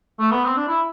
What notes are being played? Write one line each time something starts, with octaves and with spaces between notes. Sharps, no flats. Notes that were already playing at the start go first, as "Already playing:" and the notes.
A3
B3
C4
D4
E4